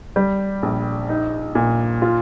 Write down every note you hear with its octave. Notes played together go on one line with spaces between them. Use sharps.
G3
A#1
D#4
A#2
F4